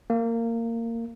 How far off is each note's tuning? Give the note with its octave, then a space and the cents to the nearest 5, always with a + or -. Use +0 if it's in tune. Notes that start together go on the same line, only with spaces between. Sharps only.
A#3 -20